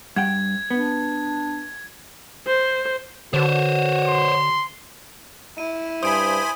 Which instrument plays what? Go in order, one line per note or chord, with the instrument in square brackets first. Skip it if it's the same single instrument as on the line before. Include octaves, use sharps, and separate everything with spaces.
[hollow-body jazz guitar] G2 F#5 G5 [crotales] G#6
[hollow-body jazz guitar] B3 [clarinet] D4
[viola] C5
[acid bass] D3 [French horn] F#4 [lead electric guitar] C5 C#5
[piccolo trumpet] C6
[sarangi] E4 [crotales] D#7
[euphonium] G2 [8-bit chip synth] C5 G#5 B5 [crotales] D#6 D7